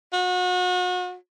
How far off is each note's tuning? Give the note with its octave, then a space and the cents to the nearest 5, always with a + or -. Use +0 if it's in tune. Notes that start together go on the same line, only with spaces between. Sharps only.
F#4 -35